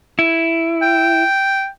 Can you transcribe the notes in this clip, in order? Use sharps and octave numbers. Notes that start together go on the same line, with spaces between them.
E4
G5